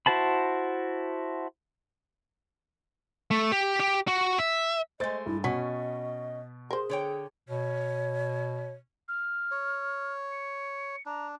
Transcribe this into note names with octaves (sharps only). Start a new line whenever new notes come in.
E4 F#4 C5 A5 B5
A3
G4
G4
F#4
E5
G#3 A3 C5 D#5 A6
G2 E4
B2 F#3 C#4 D#5 C#6 B6
G#4 A#4 C5
D3 C#5 G5
B2 C#5
F6
C#5
C#7
D4 A#5